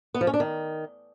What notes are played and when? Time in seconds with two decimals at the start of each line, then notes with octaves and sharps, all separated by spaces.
0.14 B3
0.21 F3
0.27 C#4
0.34 D4
0.40 D#3